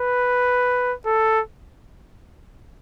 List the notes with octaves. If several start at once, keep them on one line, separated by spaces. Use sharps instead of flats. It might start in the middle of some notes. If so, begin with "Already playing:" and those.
Already playing: B4
A4